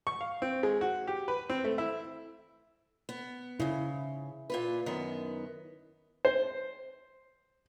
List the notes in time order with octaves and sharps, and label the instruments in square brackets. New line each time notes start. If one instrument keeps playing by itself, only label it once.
[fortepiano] C#6
F5
C4
G#3
F#4
G4
B4
C4
A3
E4
[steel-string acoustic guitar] B3
[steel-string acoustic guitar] G#2 C#3 [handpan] E4
[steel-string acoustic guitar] A#2 F4 B4
F#2 D#3 B3
[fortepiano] C5